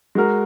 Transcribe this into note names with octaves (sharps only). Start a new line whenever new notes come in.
G#3 F#4 A#4